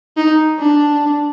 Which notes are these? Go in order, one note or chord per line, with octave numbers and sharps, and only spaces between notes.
D#4
D4